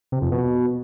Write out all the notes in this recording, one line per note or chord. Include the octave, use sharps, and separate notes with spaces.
C3
F2
B2